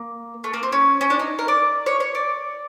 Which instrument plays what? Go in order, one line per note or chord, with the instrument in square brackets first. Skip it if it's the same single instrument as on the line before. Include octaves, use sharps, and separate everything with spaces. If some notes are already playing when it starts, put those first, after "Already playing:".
Already playing: [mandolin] A#3
A3
A#3
C4
C#4
C#4
D4
D#4
A#4
D5
C#5
C#5
D5